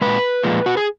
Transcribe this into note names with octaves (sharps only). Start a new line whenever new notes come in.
A#2 G#3 B4
A#2 F3 G#3
F#4
G#4